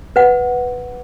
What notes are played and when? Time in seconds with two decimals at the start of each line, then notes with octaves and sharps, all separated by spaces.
0.16 B4 F#5